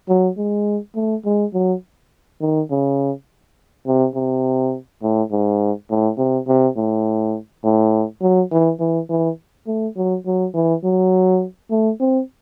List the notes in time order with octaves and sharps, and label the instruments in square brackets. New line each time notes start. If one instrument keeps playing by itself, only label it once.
[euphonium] F#3
G#3
A3
G#3
F#3
D#3
C#3
C3
C3
A2
G#2
A2
C3
C3
A2
A2
F#3
E3
E3
E3
A3
F#3
F#3
E3
F#3
A3
C4